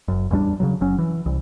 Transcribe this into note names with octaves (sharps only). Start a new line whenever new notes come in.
F#1 F#2
A1 E2 G3 D4
C#3 E3 F#3
F#1 F#3 C#4
E3
C2